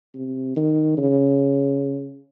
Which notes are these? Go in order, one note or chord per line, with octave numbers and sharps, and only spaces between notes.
C3
D#3
C#3